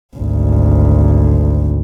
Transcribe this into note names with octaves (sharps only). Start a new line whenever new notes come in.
G#1 D2